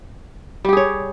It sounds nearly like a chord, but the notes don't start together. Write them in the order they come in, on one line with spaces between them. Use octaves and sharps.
G3 G4 G#4 C#5